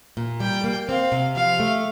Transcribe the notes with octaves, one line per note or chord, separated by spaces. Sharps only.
A#2
G3 G5
A#3
C4 F5
C3
F3 F5
A3